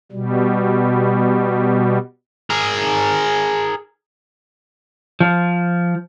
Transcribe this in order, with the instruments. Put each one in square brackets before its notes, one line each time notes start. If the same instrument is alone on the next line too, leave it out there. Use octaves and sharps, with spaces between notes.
[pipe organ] B2 G3
[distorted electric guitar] G#4 A#4
[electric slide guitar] F3